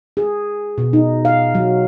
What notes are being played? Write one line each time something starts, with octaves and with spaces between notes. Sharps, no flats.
G#4
B2
D#4
F5
F#3